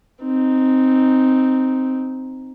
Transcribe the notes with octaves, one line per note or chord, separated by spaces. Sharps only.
C4 D#4